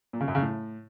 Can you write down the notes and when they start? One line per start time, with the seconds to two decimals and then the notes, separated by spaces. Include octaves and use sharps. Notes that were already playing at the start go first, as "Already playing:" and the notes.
0.13 A#2
0.21 C#3
0.28 F#2
0.35 C#3
0.42 A2